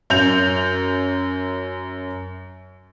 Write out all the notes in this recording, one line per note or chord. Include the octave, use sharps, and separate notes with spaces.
F#2 G6 F7